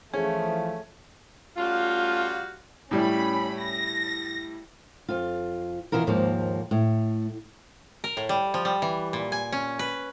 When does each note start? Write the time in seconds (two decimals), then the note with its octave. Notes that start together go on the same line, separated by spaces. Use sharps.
0.14 E3 F3 A3 C#4 G#4
1.57 G3 A3 C#4 F4 F#4 F5
2.91 A2 G3 C#4 B5
3.60 A#6
5.08 F2 F4
5.92 B2 E3 B3 F4 A#4
6.07 D#2 G#2 F3 A#3
6.71 A2
8.04 A#4
8.17 A2
8.29 G3
8.54 F3
8.65 G3
8.82 E3
9.13 A#2
9.32 G#5
9.52 C#4
9.79 B4